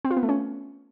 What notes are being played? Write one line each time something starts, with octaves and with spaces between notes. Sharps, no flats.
C4
F4
B3
A3
C#4